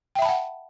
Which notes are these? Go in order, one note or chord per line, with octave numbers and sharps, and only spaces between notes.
E5 F#5 G5 A5 B5